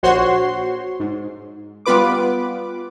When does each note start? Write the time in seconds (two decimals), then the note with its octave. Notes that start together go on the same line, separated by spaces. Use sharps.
0.03 A#1 F#4 C5 C#5 C6
1.00 G#2
1.86 G3 B3 F4 B4 D6